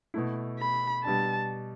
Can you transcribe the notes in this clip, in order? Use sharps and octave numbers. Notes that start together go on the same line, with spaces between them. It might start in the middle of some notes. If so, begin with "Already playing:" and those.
B2 A3 E4
B5
B2 G3 D4 A5